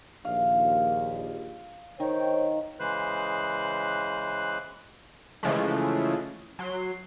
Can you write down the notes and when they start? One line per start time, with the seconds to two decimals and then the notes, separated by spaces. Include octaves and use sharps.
0.25 A#1 D#2 F5
2.00 D#3 C5 C#5 G5
2.80 C#3 E3 G#3 B4 C5 F#6
5.43 C#3 E3 F3 G#3 A3
6.59 F#3 C6